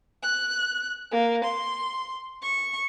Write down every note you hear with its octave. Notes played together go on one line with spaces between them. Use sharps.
F#6
A#3
C6
C#6